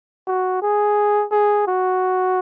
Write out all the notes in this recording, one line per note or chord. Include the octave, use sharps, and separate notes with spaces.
F#4
G#4
G#4
F#4